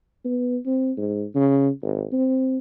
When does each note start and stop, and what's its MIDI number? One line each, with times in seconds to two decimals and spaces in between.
0.25 0.57 59
0.66 0.91 60
0.97 1.25 44
1.35 1.69 49
1.83 2.05 32
2.12 2.58 60